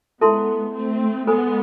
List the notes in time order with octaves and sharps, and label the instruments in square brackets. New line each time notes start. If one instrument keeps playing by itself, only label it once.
[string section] G#3 B3 [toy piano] E4 A4 E5 A5 C6
[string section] A3 C4
[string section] G#3 B3 [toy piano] A4 C5 G#5 B5